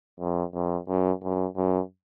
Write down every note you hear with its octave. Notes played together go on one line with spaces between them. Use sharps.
F2
F2
F#2
F#2
F#2